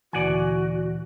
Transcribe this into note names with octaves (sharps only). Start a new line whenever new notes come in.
D2 A#2 E3 F#4 D5 F#5 G#5